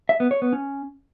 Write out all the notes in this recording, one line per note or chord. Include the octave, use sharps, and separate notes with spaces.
E5
B3
C#5
B3
C#4